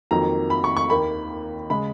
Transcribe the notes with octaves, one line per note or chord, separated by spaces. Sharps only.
F2 D#3 F#3 A#3 A#5
B5
C#6
C#6
D#2 D#3 A#3 B5
C#3 G#3 B5